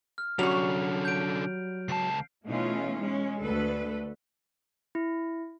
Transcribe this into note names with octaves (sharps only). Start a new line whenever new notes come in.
F6
D3 F#3 G3 C#4 F#4 F7
G6 D7
C#2 A5 C7
B2 E3 A3 C#4 D#4 F4
G#3 C#4
D2 A4 B4
E4